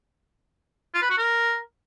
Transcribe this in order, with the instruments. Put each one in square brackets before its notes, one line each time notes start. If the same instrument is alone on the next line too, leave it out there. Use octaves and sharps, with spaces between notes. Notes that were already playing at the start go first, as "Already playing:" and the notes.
[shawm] F4
B4
F#4
A#4